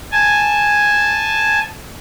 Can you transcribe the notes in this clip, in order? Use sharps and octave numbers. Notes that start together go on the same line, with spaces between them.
G#5 A5